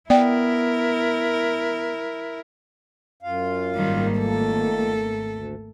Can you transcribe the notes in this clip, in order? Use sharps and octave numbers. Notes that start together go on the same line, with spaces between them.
B3 E4 A#4 D5 G5
F#2 F4 F5
G#1 D#3 G3 A#3
D#3 F3 A3 A4
D2